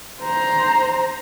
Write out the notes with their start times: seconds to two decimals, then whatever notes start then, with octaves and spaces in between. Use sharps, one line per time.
0.22 C5 A#5